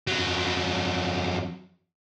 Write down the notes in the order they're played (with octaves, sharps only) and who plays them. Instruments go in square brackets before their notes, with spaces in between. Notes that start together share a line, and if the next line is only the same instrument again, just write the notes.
[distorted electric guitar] F2 F#3